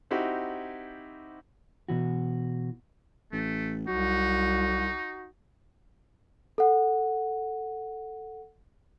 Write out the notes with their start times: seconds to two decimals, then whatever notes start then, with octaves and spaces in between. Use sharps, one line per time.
0.11 C4 D#4 E4 F#4 G4
1.89 B2 E3 F#4
3.32 A1 A3
3.88 C2 F#3 D#4 F#4
6.58 A4 F#5